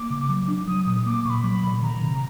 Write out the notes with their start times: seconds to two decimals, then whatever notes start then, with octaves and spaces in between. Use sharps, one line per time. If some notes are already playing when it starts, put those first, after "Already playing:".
Already playing: A#3 D6
0.10 C#3
0.29 F#3
0.48 D4
0.67 F#3 D#6
0.86 A#2 D#6
1.06 A#3 D6
1.25 A#2 B5 C#6
1.44 F#3
1.63 A#2
1.82 D#3 A#5
2.02 C3